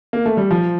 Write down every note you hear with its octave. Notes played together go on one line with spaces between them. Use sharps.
A#3
A3
G3
F3